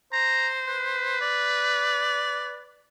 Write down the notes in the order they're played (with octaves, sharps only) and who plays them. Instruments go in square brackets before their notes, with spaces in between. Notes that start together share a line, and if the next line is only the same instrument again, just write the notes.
[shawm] C5 [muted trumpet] A#5
[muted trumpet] B4
[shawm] D5